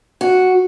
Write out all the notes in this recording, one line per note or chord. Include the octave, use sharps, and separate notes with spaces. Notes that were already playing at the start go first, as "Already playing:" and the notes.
F#4